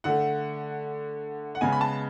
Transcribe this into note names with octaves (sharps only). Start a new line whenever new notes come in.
D3 A3 F#5
F#5
C#3 G#3 B3 G#5
B5
A5